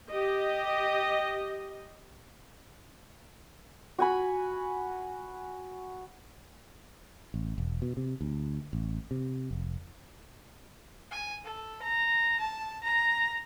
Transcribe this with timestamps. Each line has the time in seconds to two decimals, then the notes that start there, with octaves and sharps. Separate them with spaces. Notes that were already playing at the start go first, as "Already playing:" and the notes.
0.11 G4 D#5
3.99 F#4 G#5 B5
7.34 A1
7.58 E1
7.82 B2
7.97 C3
8.21 D2
8.73 A1
9.11 C3
9.51 F1
11.11 G#5
11.44 A4
11.82 A#5
12.40 A5
12.83 A#5